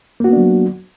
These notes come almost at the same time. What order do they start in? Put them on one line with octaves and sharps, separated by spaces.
A#3 F#4 B3 D4 F#3